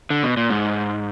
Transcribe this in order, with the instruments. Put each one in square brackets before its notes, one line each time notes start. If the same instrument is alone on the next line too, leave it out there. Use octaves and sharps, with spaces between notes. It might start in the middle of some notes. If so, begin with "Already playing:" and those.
[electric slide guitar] D3
B2
A#2
G#2